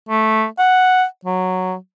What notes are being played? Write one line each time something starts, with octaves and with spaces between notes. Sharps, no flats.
A3
F#5
F#3